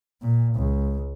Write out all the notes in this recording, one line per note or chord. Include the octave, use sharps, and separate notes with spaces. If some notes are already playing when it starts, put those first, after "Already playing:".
A#2
C#2